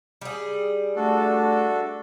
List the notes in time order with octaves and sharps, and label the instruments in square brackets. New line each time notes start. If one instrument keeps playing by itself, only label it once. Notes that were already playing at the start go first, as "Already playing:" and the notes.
[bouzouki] G3 G#4
[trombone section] A3 [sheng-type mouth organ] D4 F#4 A4